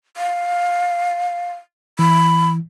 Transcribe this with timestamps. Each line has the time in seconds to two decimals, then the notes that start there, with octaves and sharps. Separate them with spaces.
0.17 F5
1.99 E3 B5